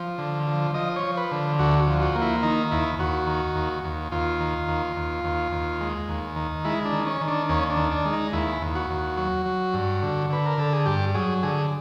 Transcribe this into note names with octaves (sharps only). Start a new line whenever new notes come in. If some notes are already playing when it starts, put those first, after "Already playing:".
Already playing: F3
D3
F3
F3 D#5
C#5
F3
B4
D3
D2 F#4
F#4
F3
F#4
A#3
E4
D#3 D#4
D#2 E4
D#2 F#4
D#3
D#2
D#2
D#2 F4
D#3
D#2
D#2
D#2
D#2
G#3
D#2
D#3
G#3 E4
D4
D#3
C#4
D#3
D4
D#2 C#4
D4
D#3
D4
G#3
D#4
D#2 E4
D#2
F#4
D#2
F#3
F#3
G2
D3
D3 B4
A#4
D3 A4
G#4
G2 G4
F#3 G#4
D3 G#4